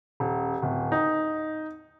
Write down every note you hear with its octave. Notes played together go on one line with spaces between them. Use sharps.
D#1
D1
D#4